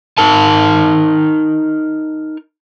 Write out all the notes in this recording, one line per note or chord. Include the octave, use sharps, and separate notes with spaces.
D#4 A#4 A5